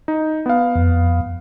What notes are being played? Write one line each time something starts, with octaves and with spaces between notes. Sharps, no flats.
D#4
B3 F5
F2